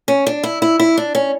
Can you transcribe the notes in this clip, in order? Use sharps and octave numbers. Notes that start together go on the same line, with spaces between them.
C#4
D4
E4
E4
E4
D4
C#4